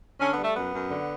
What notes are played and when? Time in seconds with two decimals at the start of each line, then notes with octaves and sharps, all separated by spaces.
0.19 D3 C#4
0.32 B3
0.37 G3
0.43 A3
0.55 F#2 B3
0.73 F#2
0.91 D3